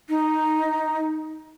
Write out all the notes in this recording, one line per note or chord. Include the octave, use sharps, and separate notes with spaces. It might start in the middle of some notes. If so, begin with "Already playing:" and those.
D#4